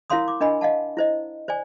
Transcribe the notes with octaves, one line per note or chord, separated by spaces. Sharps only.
E4 A#4 C#5 F5 C6 D#6
D6
D4 A#4 D#5 G#5 B5
D#5 F5 F#5 A5
E4 C5 D#5
C5 D5 G#5